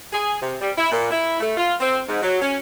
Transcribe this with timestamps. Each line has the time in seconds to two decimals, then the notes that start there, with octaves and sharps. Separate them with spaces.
0.13 G#4
0.41 C3
0.61 G3
0.77 E4
0.92 A#2
1.11 E4
1.40 A3
1.56 F4
1.80 C4
2.08 G#2
2.22 F#3
2.41 C#4